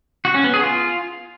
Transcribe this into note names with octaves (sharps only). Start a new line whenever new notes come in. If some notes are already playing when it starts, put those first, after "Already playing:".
F#4
C#4
B3
G#4
F4